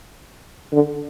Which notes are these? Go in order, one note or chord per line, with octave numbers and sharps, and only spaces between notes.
D3